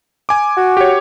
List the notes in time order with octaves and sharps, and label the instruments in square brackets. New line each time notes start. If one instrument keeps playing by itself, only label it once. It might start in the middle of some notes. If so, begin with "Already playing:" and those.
[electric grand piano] G#5 D6
[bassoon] F#4
[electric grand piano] G4 C#5